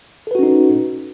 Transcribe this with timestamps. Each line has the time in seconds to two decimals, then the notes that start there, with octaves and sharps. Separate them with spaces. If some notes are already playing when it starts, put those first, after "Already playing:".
0.27 A4
0.31 B4
0.35 F#4
0.39 C#4
0.43 D#4